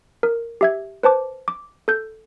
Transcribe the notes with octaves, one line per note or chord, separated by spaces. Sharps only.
A#4
G4 E5 G#6
B4 C5 A5 D6
D6
A4 G6